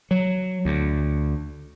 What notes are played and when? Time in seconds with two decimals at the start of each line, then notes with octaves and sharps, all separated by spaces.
0.11 F#3
0.65 D2